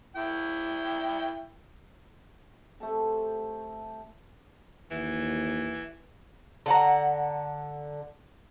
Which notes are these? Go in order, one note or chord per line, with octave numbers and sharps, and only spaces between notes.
E4 G5
A3 C4 G4 A4
D#2 E3
D3 F#5 A#5